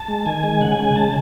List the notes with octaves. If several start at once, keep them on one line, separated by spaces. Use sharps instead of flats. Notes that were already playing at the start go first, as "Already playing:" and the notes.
Already playing: A5
G#3
D#3 G#5
G#3
C#3 F#5
G#5
G#3
G#5
C#3 A5